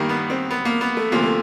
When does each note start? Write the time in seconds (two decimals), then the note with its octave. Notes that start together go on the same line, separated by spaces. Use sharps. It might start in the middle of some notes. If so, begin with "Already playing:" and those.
Already playing: G2 D#3 G3 A#3
0.09 B3
0.30 C4
0.51 B3
0.65 A#3
0.81 B3
0.97 A3
1.12 D2 C3 F3 A#3
1.23 A3